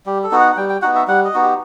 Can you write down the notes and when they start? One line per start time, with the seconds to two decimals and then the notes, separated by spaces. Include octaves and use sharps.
0.06 G3 G4
0.24 A4
0.31 B3 D#4 F#4
0.40 F#5
0.52 F#5
0.57 G3 G5
0.69 G5
0.82 B3 D#4 F#4 F#5
0.95 E5
1.08 G3 F#5
1.25 D#5
1.34 B3 D#4 F#4
1.42 G4